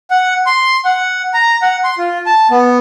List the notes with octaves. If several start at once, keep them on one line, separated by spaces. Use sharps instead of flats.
F#5
C6
F#5
A#5
F#5
C6
F4
A5
B3